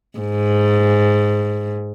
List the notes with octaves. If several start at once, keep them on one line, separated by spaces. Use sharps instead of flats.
G#2